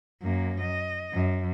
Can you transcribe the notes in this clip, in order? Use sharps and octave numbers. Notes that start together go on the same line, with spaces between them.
F#2 A#3
D#5
F#2